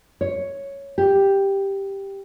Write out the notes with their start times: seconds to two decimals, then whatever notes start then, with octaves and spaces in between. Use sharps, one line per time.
0.21 C#5
0.98 G4